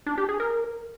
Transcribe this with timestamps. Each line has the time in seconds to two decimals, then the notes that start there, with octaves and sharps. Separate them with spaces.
0.06 D4
0.18 G4
0.29 G#4
0.40 A#4